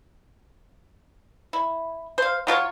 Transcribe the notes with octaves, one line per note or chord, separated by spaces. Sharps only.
E4
C5 F5
F#3 F4 B4 C#5